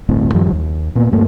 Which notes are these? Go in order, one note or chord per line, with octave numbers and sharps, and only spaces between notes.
D1 G1 A2 C4
F#2 D#3 F3 G3
D#2
A#2 A#3 B3
D2 G2 A3 A#3